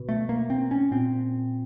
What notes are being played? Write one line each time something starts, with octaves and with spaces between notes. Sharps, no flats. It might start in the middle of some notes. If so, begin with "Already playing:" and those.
Already playing: B2
A3
A#3
C4
C#4
A#2 C4